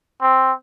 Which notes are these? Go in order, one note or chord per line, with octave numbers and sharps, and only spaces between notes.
C4